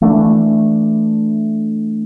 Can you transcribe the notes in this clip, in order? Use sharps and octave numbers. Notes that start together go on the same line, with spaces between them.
E3 A3 D4